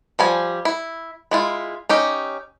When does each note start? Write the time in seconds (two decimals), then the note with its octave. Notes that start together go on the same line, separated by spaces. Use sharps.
0.19 F3 G3 G#5
0.65 E4
1.31 G#3 E4 F4
1.89 C#4 D#4 G4